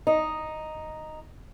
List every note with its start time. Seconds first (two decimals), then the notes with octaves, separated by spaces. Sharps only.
0.07 D#4